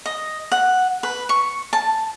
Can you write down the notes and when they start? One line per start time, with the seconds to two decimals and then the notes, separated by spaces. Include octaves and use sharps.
0.06 D#5
0.52 F#5
1.03 B4
1.29 C#6
1.73 A5